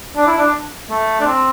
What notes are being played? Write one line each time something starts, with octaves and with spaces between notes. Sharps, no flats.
D4
E4
D4
A3
D4
C4